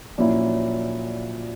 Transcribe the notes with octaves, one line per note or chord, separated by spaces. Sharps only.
A#1 A#2 F#3 C#4 E4